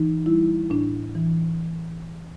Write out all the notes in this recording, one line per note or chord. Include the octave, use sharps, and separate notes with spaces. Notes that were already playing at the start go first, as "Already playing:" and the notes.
Already playing: E3 D#4
G3 E4
A2 D4
E3